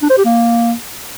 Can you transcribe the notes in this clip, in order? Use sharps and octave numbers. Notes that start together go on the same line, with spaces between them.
D4
C5
G4
A#3